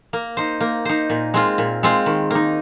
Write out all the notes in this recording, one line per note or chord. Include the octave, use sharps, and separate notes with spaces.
A#3
D#4 C5
A#3
D#4 C5
A#2
G#3 C4 F4
A#2
G#3 C4 F4
D#3
A#3 D#4